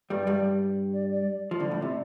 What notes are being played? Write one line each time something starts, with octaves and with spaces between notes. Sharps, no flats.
G2 G3 D5
G2 G3
D5
D5
F3
D2 D3 D5
A2
C3